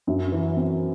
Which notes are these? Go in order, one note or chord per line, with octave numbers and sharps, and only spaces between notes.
F#2
E3
C4